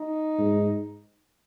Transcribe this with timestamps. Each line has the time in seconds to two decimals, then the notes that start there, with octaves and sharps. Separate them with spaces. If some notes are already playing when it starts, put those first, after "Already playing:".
Already playing: D#4
0.39 G#2